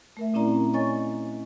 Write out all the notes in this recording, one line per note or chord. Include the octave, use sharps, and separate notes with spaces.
A3 A#4 E5
A#2 C4 C#4 E4 D5 A#5
C#5 D#5 G#5 C#6 A6